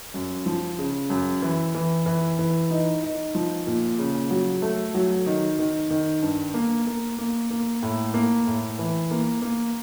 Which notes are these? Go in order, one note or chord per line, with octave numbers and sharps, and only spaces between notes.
F#2
F3
C#3
F#2
E3
E3
E3
E3
D#4
D#4
F3
A#2
C#3
F#3
A3
F#3
D#3
D#3
D#3
G2
A#3
A#3
A#3
A#3
A2
A#3
A2
E3
A#3
A#3